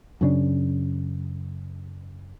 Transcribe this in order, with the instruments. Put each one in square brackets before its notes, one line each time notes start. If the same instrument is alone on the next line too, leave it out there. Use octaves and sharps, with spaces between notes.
[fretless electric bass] F#2 C#3 D4